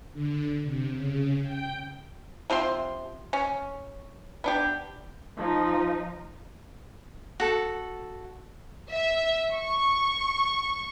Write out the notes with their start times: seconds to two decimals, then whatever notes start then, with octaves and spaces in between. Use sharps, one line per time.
0.13 D3
0.64 C3
0.94 C#3
1.42 G5
2.50 C3 F3 C4 C6
3.33 C#4
4.44 B3 D4 G4
5.38 F3 D#4
7.40 F#4 A4
8.89 E5
9.54 C#6